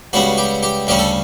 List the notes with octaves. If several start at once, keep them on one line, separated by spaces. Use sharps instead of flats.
C#2 C#3 G3 B3 F#4
G4
G4
D2 C#3 G3 C#4 G4
A4